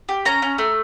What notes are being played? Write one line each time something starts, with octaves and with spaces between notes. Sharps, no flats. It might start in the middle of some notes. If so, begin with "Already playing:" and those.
G4
C#4 A#5
C#4
A3